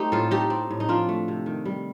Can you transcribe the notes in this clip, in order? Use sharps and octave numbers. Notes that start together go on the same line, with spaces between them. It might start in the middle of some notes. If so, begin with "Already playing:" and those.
Already playing: A3 C4 D#4 G4
A2 F4 A4
A3 D#4 G4
C4
A2
D#4
F3 D4 F4
A3
C3
D#3
G3